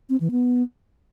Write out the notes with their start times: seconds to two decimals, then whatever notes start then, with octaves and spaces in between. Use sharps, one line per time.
0.09 C4
0.20 E3
0.31 B3